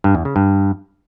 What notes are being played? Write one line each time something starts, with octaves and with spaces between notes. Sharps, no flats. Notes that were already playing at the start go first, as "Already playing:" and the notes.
G2
E2
C#3
G2